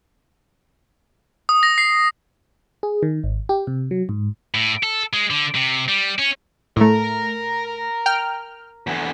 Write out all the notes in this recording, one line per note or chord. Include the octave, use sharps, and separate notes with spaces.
D#6
A#6
C7
G#4
D#3
G#1
G4
C3
F#3
G#2
A2
A4
G#3
D3
C3
G3
C#4
A2 A3 A#4 A#5
G5 F6
E2 D3